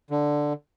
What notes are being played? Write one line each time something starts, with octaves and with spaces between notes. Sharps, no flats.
D3